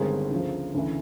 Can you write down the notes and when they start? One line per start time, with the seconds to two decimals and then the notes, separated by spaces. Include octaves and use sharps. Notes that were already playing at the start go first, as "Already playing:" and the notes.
Already playing: G1 G2 D#3 G#3 C4 G#4 A#4
0.31 D2 C#3 F3
0.75 D2 C#3 E3